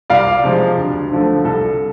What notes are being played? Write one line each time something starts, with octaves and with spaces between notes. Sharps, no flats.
C2 D5 F5
C3 F3 G#3
D2
D3 F3 A3
C2 A4